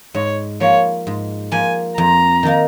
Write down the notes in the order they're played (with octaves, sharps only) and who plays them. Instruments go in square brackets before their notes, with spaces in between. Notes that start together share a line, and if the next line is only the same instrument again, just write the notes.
[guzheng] G#2 [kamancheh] C#5
[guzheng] F3 A#3 [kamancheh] C#5
[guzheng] G#2
[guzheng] F3 A#3 [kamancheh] G#5
[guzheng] F2 [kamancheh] A#5
[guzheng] D#3 A#3 D#4 A#4